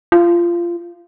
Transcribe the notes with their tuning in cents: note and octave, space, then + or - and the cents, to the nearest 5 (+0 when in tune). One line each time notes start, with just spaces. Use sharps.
F4 -20